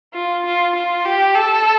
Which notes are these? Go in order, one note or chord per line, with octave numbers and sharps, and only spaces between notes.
F4
F4
F4
G4
A4